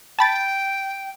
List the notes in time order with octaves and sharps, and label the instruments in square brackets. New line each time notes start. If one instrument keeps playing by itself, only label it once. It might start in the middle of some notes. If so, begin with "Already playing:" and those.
[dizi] G5 [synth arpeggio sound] A5 B5 A6